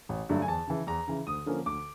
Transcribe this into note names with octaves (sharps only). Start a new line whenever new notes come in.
A1
G2 D3 F#3 A3
G#5
E2 A5
C#3 E3
E2 A#5
C#3 E3
D2 D#6
D3 F3 A#3 C#4
D2 D6